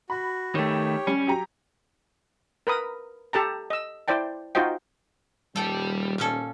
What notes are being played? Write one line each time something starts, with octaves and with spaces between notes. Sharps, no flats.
F#4 B5
D#3 A3 G4 C#5
G3 C#4
F#3 G4 A#5
A#4 B4 B5 D#6
G4 A4 A5 A#5
D#5 E6
E4 C5 D5 G5 A5
D#4 F4 F#4 C5 D#5 G5
D#1 G3 A4 G5
A#2 C#4 A4